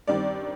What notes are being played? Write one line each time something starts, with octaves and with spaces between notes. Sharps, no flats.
G2 D#3 G3 C4 D5